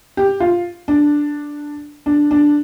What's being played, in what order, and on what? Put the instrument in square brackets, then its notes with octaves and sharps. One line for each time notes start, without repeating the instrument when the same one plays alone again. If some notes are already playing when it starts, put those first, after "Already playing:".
[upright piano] G4
F4
D4
D4
D4